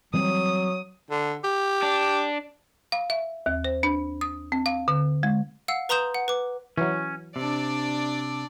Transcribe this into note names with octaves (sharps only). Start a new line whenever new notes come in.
E3 F#3 G3 C4 D#6
D3
G4
D4
F5
E5
D#2
C5
D4
D#6
C4
F5
D3
G#3
F5 F#5 E6
B4 A#5 C6 D#6 G6 E7
F#5
B4 D6
E3 F#3 C#4
C3 D4 D5